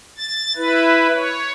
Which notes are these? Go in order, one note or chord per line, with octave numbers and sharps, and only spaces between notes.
A6
E4 B4
C#5